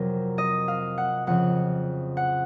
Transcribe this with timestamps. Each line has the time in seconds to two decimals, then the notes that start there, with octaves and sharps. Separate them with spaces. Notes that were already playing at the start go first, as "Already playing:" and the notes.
Already playing: F2 C3 F#3 A#4
0.38 D#5
0.68 F5
0.98 F#5
1.27 F2 C#3 F3 F#5
2.17 F#5